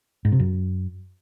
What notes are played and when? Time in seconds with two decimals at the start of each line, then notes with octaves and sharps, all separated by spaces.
0.25 G#2
0.32 C3
0.39 F#2